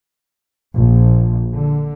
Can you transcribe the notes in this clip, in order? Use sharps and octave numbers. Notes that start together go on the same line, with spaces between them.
A#1
D3